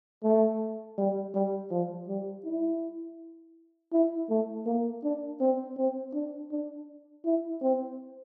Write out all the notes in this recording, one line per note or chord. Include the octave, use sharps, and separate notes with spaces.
A3
G3
G3
F3
G3
E4
E4
A3
A#3
D4
C4
C4
D4
D4
E4
C4